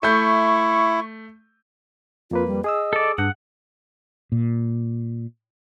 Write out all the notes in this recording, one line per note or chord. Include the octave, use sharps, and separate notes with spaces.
A3 E4 C#6 G6
F2 A#3 F4 B4
G3
G#4 D#5 D#6 E6
A4 D5
G2 D4 F#5
A#2